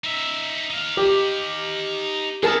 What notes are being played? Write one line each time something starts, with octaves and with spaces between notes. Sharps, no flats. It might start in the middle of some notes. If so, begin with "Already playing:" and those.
D#4 E5
D#4 F5
G4
G#3 A3 G#4 A#4 A5